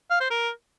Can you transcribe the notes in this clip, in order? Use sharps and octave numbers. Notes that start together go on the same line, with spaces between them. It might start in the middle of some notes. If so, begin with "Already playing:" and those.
F5
C5
A#4